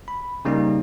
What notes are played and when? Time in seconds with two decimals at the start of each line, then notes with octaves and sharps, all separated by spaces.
0.08 B5
0.45 C#3 G3 A#3 C#4 D#4